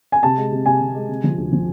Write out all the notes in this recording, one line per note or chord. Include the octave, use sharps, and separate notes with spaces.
G#5
C3 A5
G#3
C3
C3 G#5
C3
G#3
C3
F3
D2
F3